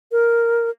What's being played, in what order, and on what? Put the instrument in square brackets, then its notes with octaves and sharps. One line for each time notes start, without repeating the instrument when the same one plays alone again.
[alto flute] A#4